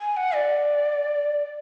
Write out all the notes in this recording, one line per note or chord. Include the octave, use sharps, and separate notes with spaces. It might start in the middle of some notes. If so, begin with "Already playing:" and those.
G#5
F#5
D5